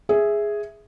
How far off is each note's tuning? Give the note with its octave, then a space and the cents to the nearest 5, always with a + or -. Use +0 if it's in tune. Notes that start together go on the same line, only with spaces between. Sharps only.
G#4 +0 E5 +0